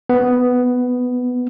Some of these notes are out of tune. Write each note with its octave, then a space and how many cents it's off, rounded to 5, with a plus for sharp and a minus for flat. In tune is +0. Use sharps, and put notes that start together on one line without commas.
B3 +5